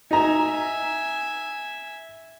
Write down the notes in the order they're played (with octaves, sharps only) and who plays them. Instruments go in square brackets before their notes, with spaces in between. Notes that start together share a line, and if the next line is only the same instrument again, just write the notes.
[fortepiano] D#4 A#5 [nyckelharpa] E5 G#5